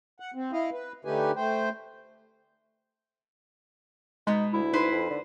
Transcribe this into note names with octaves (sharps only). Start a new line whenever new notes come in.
F#5
C4
E4 D#5 F5
B4
D3 A3 D#4 G4 B4 G#5
A3 C5 G5
B2 G#3 B3 D#4
D2 E4
D#4 B4 C5
F2
D3